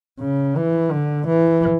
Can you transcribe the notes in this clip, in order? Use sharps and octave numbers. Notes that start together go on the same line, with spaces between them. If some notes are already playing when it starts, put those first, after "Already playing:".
C#3
E3
D3
E3